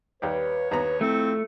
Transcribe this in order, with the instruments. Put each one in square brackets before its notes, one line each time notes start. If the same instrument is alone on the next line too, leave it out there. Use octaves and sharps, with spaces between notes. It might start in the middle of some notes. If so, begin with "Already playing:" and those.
[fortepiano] D#2 G3 G4 [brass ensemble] B4 [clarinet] C#5
[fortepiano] D#2 B3 A#5 [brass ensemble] B4
[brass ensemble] F3 E4 [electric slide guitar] A3 [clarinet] C4